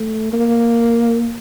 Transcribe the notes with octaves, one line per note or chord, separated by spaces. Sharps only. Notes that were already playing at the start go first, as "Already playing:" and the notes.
Already playing: A3
A#3